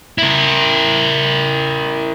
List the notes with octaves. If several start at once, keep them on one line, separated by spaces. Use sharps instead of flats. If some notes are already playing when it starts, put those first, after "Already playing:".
E4 A#4